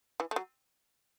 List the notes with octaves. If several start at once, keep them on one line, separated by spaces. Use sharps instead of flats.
E3
A3
F#3